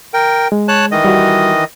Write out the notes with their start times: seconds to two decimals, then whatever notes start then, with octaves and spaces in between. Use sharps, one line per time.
0.14 A#4 G5
0.52 G#3
0.68 C#5 A5 F#6
0.92 D#3 E3 D#5
1.04 G3 F#4